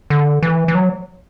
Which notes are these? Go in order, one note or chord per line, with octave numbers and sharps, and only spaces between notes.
D3
E3
E3
F#3